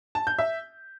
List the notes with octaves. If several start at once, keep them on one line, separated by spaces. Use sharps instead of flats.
A5
G6
E5